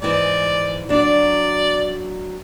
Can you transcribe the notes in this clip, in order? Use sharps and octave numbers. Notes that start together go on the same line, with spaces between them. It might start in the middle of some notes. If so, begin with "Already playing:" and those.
G#2 E3 D5
F#3 D4 D5